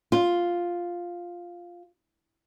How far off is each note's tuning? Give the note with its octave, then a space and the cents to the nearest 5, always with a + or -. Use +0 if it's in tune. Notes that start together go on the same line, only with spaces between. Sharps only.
F4 +0